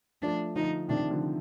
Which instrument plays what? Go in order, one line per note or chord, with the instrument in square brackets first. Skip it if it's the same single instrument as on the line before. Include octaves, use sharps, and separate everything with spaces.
[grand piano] F3 A3 [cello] D4
[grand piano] D3 F3 [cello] D#4
[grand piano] C3 D#3 [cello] D4
[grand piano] D3 F3